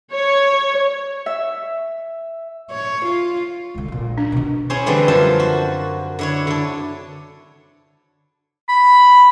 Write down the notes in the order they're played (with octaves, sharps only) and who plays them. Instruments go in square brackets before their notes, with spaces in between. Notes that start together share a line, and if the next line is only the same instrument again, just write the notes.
[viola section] C#5
[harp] E5
[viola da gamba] C#5
F4
[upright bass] D3 G#3
A#1 A#2
[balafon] D4
[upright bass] B2 D#3
[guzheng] C#4 E4 G#4 C5 C#5
D3 E3 G3 A3 C4
F#2 F3 A#4 C5 A5
F#4
D3 E4 C#5
D3 A4
[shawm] B5